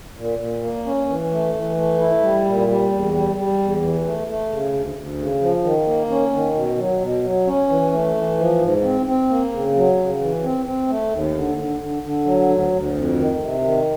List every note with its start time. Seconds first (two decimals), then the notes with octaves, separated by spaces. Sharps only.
0.17 A#2
0.39 A#2
0.62 A#3
0.86 C#4
1.08 E3
1.31 A3
1.54 E3
1.76 A3
1.99 E4
2.21 G3
2.45 A#2
2.67 G3
2.91 E2
3.13 G3
3.36 G3
3.59 E2
3.82 E3
4.04 A3
4.27 A3
4.50 C#3
4.73 D2
4.95 D2
5.19 C#3
5.41 F3
5.64 D#3
5.86 A#3
6.10 C#4
6.32 D#3
6.55 B2
6.78 F#3
7.01 B2
7.23 F#3
7.47 C#4
7.69 E3
7.92 A3
8.15 E3
8.38 F3
8.61 G#2
8.83 C4
9.06 C4
9.29 A#3
9.52 C#3
9.75 F#3
9.97 C#3
10.20 E3
10.43 C4
10.65 C4
10.88 A3
11.11 D#2
11.34 D3
11.58 D3
11.80 D3
12.03 D3
12.26 F#3
12.49 D2
12.72 D2
12.94 F2
13.16 D#3
13.39 C3
13.63 D#3